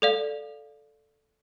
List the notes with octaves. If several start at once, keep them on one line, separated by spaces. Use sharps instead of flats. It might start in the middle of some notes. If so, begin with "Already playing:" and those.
A4 D5 F5